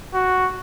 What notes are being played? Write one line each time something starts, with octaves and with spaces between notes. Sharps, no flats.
F#4